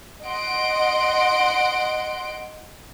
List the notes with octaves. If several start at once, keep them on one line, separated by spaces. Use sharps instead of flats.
D#5 F#5 C6 D7